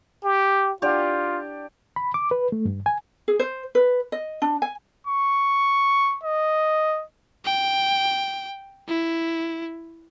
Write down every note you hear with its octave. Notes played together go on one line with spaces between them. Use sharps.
G4
D4 F4 G4 D5
B5
D6
B4
A3
G2
G#5
G#4
C5
B4
D#5
D4
G#5
C#6
D#5
G5
E4